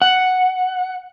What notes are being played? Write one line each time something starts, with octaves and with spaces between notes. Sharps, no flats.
F#5